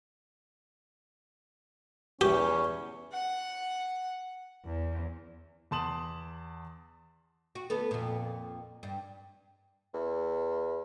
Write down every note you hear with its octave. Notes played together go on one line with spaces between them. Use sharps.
E2 C#4 G4
F#5
E2
E2 A5 C6 D#6 E7 F#7
F#4
D2 B3 A4
F2 A#2
G2
E2